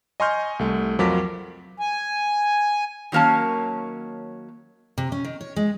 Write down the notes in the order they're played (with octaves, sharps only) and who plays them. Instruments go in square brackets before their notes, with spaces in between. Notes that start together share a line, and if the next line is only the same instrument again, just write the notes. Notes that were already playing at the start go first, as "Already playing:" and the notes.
[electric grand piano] D#5 G#5 C6 C#6 F6 G6
C2 A3
F2 F#3 F4 A#4 D6 B6
[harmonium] G#5
[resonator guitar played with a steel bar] D#3 F#3 A#3 C#4 A5
[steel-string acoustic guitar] C3
C#4
D#3
C#5
G#3